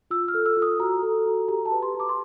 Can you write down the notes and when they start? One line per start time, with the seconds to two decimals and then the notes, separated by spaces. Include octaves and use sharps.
0.10 F4 E6
0.28 F6
0.34 A4
0.46 E6
0.57 F4
0.62 D#6
0.80 F#4 A#5
1.03 A4
1.26 F#4
1.48 G4 A#5
1.66 A5
1.72 B4
1.82 C6
1.94 G4
2.00 D6
2.09 C6